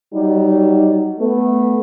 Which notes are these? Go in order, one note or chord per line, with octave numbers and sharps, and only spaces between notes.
F#3 G3 D#4
A3 B3